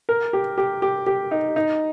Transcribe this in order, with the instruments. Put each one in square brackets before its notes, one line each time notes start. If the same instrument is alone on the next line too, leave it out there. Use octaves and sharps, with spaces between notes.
[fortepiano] A#4
G4
G4
G4
G4
D#4
D#4